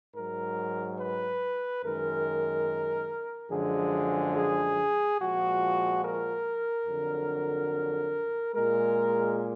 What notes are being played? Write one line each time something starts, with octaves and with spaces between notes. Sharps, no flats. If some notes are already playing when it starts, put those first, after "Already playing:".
G#2 F#3 A#4
B4
F#2 D#3 G#3 A#4
F#2 D3 F3 G#3 G#4
G#4
A#2 F3 G#3 F#4
A#4
F2 D3 F#3
A#2 G#3 A#4